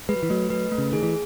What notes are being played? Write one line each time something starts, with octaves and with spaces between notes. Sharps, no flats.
G#3 B4
F#3
E3
F#3 A3
F#3 B4
A3
C#3
D#3 G#4
E3